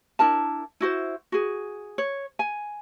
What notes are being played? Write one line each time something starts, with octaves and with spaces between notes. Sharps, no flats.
D4 E4 A#4 A5
E4 F#4 C5
F#4 G#4
C#5
G#5